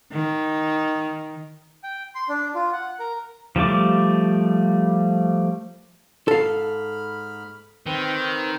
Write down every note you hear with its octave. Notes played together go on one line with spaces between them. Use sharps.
D#3
G5
C6
D4
F4
F#5
A#4
F3 G3 A3 D6
G#2 A4 F5 B5 F6
D#3 C4 B4